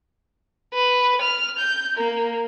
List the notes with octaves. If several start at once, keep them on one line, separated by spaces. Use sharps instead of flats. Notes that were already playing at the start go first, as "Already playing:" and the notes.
B4
F6
G6
A#3